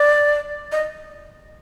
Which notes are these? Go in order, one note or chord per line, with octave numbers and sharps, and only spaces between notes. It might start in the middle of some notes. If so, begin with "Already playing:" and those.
Already playing: D5
D#5